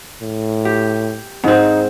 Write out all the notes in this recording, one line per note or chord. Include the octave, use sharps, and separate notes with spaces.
A2
G4
G#2 C4 D#4